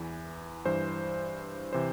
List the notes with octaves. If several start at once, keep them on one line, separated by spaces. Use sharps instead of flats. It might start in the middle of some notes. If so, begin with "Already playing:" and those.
Already playing: E2 E3
G2 E3 C5
C3 E3 C5